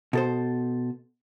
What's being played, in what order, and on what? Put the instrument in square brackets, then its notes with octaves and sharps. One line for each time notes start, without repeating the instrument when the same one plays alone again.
[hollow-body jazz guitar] B2 A4 C5